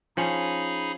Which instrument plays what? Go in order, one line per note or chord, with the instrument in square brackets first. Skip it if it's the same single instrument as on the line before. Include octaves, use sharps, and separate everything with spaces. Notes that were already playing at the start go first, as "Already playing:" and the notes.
[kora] F3 C#4 [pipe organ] D#4 G#4 B5